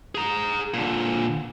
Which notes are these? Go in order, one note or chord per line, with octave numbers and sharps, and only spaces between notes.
G#4 A#5
A#2 D3